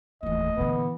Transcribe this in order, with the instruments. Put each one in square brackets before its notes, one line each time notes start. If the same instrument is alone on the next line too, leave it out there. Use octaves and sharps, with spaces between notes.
[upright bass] F1 D#2 [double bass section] E3 A3 [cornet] D#5
[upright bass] A#2 D3 [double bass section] E3 [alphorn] B3